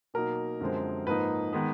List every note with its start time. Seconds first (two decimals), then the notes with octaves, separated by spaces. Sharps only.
0.14 B2 F#3 A#3 D#4 A#4
0.61 F#2 D3 F3 G#3 C4
1.07 G#2 F3 A#3 D#4 B4
1.53 D#3 G#3 B3